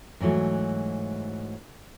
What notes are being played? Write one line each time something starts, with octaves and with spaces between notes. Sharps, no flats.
G#2 E3 F#3 A3